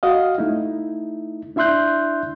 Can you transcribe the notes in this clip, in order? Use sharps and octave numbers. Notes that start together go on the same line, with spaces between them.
F#4 D#5 F5
A3 D#4 E4
D4 E4 E5 C6 F#6 G6